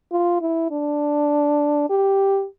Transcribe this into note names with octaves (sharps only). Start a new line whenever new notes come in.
F4
E4
D4
G4